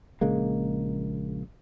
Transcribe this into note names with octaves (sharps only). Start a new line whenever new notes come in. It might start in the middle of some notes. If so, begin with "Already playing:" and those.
A#1 C#3 G#3 A#3